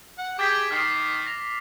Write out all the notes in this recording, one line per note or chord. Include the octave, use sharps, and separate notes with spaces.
F#5
G4 G#4 G5 D6 A6 B6
D#3 F6 C7
A#6 F7